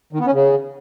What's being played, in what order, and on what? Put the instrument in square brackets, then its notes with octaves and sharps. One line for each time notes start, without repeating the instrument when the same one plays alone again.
[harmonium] D#3
B3
C#4
C#3